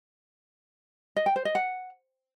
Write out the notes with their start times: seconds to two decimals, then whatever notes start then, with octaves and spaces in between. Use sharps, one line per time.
1.16 D#5
1.26 G5
1.36 C5
1.45 D#5
1.55 F#5